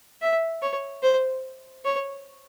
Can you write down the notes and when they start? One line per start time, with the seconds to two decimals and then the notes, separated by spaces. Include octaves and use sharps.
0.22 E5
0.62 C#5
1.03 C5
1.85 C#5